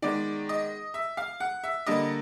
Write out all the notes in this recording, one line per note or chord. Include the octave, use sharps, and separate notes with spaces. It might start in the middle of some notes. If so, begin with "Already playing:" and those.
D#3 G#3 B3 D5
D#5
E5
F5
F#5
E5
D3 G3 A#3 D#5